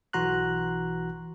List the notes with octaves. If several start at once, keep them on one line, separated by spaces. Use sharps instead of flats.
B1 E3 F#4 A#5 C6 F#6